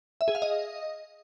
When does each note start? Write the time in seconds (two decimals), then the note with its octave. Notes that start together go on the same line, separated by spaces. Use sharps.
0.21 E5
0.28 G#4
0.35 F5
0.42 D#5